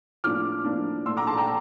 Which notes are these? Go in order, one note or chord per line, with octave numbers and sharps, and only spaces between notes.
A2 F3 A#3 D4 D6 F6
A2 F3 A#3 D4
A#2 A3 D4 C6 E6
A#5 D6
A5 C6
G5 A#5